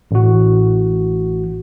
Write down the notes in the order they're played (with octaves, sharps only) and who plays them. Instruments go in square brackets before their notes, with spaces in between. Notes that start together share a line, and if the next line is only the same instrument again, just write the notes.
[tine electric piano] A1 F#4